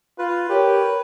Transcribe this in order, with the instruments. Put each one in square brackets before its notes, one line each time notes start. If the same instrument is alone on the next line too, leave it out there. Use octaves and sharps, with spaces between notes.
[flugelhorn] F4 [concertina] B4
[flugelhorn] G4 [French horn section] A#4 C#5